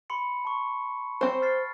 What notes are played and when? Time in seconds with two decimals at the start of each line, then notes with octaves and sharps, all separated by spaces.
0.10 B5 C6 C#7
0.45 A5 C#6
1.21 C4 C5
1.42 F6 A6 C7